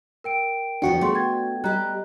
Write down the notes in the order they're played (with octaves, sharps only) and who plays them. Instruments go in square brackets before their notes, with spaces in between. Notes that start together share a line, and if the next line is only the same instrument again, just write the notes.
[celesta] A#4 G5 D7
[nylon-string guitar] E2 D3 F3 [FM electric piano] D4 F#4 [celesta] G5 C#7
[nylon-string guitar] A3 B3 [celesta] G#4 C6 C#6
[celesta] G5 G#6 A6
[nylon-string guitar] G3 G4 [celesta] D#5 A#5 F#6